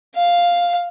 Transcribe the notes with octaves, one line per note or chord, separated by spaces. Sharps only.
F5